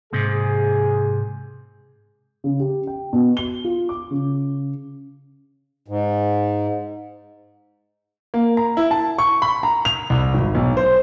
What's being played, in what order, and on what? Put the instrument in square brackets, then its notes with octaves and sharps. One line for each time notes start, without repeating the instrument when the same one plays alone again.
[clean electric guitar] G#2 C3 [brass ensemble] G#4
[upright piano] C#3
G4
G5
B2
G7
F4
D6
C#3
[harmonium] G#2
[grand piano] A#3
A#5
E4
A5
C#6
B5
A#5
F7
C2
G#1
B1
C5